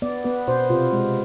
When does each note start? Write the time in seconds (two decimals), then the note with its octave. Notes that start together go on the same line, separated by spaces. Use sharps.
0.02 B3 D5
0.24 B3 B4
0.48 B2 C5
0.70 C3 F4
0.93 G#3